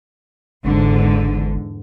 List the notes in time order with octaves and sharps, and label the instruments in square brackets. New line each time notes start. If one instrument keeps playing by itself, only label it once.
[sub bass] G1 [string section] E2 G#2 D3